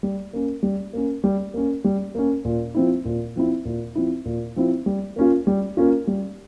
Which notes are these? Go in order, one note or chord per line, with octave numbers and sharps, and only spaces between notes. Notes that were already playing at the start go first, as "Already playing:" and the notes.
G3
A#3 C#4
G3
A#3 C#4
G3
A#3 C#4
G3
A#3 C#4
A#2
F3 C4 E4
A#2
F3 C4 E4
A#2
F3 C4 E4
A#2
F3 C4 E4
G3
A#3 C#4 F4
G3
A#3 C#4 F4
G3